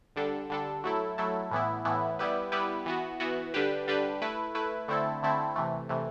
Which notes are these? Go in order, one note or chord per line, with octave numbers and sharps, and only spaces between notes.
D3 G3 D4 A4
D3 G3 D4 A4
F#3 A3 E4 A4
F#3 A3 E4 A4
A2 E3 B3 E4
A2 E3 B3 E4
G3 B3 E4 G4 B4
G3 B3 E4 G4 B4
E3 B3 F#4
E3 B3 F#4
D3 G3 D4 G4 B4
D3 G3 D4 G4 B4
A3 E4 B4
A3 E4 B4
D3 A3 C4 E4 A4
D3 A3 C4 E4 A4
C3 E3 A3
C3 E3 A3